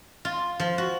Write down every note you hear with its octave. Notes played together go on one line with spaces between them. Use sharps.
F4
F3
F#4